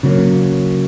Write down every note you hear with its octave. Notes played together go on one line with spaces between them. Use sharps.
C#3 F#3 A#3 C#4